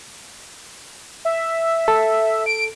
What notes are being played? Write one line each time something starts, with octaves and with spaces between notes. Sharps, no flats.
E5
A4
D7